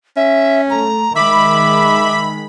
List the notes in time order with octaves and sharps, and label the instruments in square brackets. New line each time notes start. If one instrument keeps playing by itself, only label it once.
[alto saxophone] C#4 [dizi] E5
[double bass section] A3 [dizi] A#5
[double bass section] D#3 G#3 [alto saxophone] E5 [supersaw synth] B5 [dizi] D6